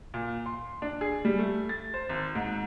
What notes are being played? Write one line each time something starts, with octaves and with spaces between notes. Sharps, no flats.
A#2
C6
D4
G#4
G3
A3
A6
C5
G#1
G#2